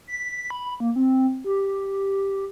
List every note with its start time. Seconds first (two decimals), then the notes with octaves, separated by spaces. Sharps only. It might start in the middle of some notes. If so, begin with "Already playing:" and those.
0.07 B6
0.50 B5
0.80 A#3
0.96 C4
1.44 G4